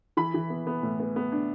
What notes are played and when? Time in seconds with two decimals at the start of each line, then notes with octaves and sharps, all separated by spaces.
0.17 E3 B5
0.34 E3
0.50 B3
0.67 B3
0.83 A2
1.00 B3
1.16 B3
1.32 D4